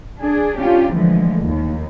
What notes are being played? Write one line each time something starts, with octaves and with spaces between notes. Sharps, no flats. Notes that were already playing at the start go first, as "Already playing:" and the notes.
D4 G#4
C#4 D4 F4 G4
D3 E3 F3 G#3 A3
D#2